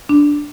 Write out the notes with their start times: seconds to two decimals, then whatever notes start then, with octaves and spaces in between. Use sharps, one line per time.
0.09 D4